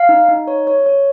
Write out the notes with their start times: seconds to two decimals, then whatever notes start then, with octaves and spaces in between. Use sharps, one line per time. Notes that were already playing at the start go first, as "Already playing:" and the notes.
Already playing: F5
0.09 D#4
0.28 D#4
0.48 C#5
0.67 C#5
0.86 C#5